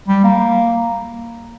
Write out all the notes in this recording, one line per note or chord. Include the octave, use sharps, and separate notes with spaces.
G3
A#3